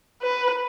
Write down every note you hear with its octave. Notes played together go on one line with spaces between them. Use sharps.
B4